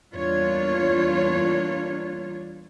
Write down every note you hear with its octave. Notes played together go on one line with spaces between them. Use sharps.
E2 G3 A#3 D4 F4 C#5